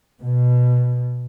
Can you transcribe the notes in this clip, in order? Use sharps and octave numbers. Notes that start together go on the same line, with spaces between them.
B2